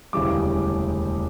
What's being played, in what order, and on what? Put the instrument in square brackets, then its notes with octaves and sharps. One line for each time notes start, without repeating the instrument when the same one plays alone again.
[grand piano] E1 D2 C#3 E3 G3 D6